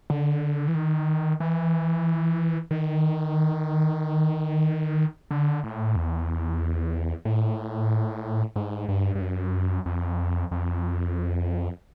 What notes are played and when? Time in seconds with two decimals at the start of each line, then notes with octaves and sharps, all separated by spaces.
0.10 D3
0.68 E3
0.75 D#3
1.40 E3
2.71 D#3
5.31 D3
5.64 A2
5.96 E2
7.25 A2
8.56 G#2
8.88 G2
9.15 G2
9.21 F#2
9.86 F2
10.51 F2